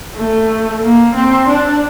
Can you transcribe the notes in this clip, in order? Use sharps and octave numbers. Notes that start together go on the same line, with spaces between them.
A3
A#3
C4
D4